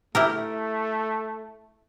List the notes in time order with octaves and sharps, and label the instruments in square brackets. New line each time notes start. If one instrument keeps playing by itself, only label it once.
[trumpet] A3 [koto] E4 G4 A#4